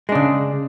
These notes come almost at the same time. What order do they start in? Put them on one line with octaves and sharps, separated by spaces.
G#3 D4 C#3